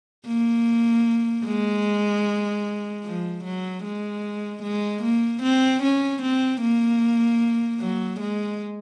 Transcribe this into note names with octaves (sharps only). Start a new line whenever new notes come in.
A#3
G#3
F3
F#3
G#3
G#3
A#3
C4
C#4
C4
A#3
F#3
G#3